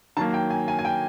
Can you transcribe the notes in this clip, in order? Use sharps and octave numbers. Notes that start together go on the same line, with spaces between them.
D#3 F#3 A#3 A5
G5
G#5
G#5
G#5
G5